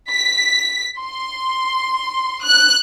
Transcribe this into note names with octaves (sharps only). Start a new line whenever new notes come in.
B6
C6
F#6